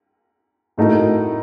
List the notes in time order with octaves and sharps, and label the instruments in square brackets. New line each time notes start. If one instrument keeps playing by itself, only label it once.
[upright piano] A2 A3 D#4 F#4 A#4